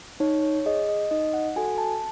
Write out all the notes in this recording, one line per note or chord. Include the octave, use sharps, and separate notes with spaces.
D#4 C#5
C#5
G#4 D#5
D#5
D#4 D#5
F#5
F#4 A4 G#5
A5